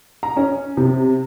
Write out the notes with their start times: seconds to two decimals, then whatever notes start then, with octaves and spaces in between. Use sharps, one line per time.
0.23 A#5
0.37 C#4
0.77 C3